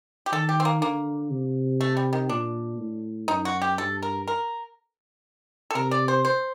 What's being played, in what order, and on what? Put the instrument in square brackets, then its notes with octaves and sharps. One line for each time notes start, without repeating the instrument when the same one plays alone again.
[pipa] G4
[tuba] D#3 [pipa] A4
[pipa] G4
C4
A#3
[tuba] D3 [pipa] A#3
[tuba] C3
[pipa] A3
G3
D#3
[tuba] A#2 [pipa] D4
[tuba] A2
[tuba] F#2 [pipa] D#4
[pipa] F#4
G4
[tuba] G2 [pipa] A4
[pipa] A#4
A#4
A4
[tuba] C3 [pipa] A#4
[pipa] D5
C5
C5